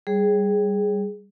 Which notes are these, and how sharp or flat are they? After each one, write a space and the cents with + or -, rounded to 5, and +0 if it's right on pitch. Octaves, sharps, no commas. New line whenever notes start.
G3 +0 G#4 +0 C#5 +0